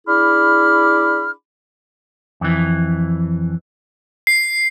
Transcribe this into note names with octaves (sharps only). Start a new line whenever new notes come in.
D4 E4 G#4 B5 D6 F6
F2 E3
C7